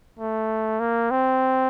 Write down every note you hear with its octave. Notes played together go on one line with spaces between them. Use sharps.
A3
A#3
C4